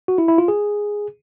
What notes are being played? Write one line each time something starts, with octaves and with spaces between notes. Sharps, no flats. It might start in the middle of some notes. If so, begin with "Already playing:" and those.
F#4
E4
E4
F4
G#4